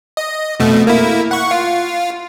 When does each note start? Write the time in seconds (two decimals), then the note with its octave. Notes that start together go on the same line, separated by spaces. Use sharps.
0.17 D#5
0.60 F2 B2 A3
0.87 A#3 E4
1.31 F#5 C#6
1.51 F4